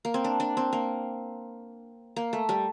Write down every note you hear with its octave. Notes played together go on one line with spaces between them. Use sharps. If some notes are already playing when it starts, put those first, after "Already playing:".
A#3
C4
D4
D4
C4
A#3
A#3
A3
G3